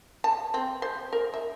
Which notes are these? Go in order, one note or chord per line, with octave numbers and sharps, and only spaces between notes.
A5
C4
C5
A#4
E5